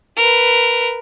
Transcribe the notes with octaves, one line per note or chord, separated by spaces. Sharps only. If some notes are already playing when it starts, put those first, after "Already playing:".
A#4 B4